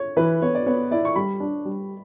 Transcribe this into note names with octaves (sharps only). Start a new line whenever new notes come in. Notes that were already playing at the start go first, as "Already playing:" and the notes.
Already playing: C#5
E3 B4
B3 C#5
D5
B3 C#5
E4 D5
C#6
G3 B5
D4
G3